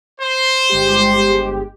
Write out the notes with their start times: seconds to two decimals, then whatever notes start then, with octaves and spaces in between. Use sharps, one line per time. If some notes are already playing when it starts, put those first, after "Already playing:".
0.21 C5
0.70 G1 G#3 G4